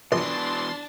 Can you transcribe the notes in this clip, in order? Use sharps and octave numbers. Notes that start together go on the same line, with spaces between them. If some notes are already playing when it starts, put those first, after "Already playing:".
A#1 B2 E3 D4 A5 C6